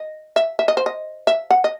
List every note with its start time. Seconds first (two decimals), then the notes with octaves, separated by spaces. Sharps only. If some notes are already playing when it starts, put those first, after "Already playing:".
Already playing: D#5
0.36 E5
0.59 E5
0.68 D#5
0.77 C5
0.86 D#5
1.27 E5
1.50 F#5
1.64 D#5